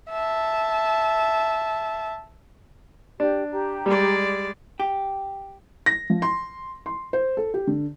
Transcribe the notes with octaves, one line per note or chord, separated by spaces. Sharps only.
E5 A5
D4 G4
G4 A#5
G3 G#3 D5
G4
A#6
F3
C6
C6
C5
A4
G4
D3